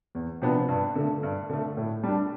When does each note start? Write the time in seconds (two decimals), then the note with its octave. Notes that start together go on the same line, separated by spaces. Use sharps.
0.15 E2
0.42 C3 F3 B3 D4
0.69 G2
0.95 D3 A3
1.23 G2
1.50 D3 A3
1.77 A2
2.04 G3 D4